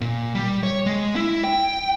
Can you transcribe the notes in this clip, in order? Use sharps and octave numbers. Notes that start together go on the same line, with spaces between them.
A#2
G3
C#5
G#3
E4
G5